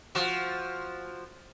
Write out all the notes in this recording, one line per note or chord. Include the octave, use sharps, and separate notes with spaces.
F3 F#4